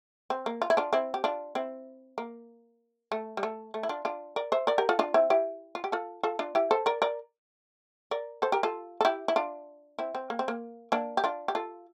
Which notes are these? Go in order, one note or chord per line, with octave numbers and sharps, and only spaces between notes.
C4
A#3
F4
E4
D4 F4
C4 E4
G4
D4 F4
C4 E4
A#3
A3
G3
A3
A3
E4
D4 F4
D4 F4
A#4 D5
C5 E5
A#4 D5
G4 A#4
F4 A4
D4 F4
C4 E4
E4 G4
F4
G4
F4 A4
F4 A4
D4 F4
E4 G4
A4 C5
A#4 D5
A#4 D5
A#4 D5
A4 C5
G4 A#4
F4 A4
A4
E4 G4
E4
D4 F4
C4 E4
C4
A#3
C4
A#3
A#3 D4
G4
D4 F4
G4
F4 A4